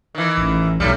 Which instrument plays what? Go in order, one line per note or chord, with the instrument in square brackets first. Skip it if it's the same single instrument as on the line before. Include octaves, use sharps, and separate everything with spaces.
[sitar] D#3 E3
[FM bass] A1
[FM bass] B1 [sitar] A2 G3